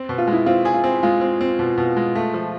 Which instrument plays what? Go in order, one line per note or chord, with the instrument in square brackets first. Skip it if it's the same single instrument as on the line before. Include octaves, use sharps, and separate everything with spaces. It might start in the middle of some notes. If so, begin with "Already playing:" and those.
Already playing: [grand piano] C4
B2
[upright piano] F4
[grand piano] G#3
[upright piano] E4
[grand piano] C4 [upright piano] F4
[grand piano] G#4
[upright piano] F4
[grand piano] C4
[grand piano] G#3 [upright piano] F4
[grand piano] C4
C4
B2
B2
G#3
[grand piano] A3 [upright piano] F4
[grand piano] F3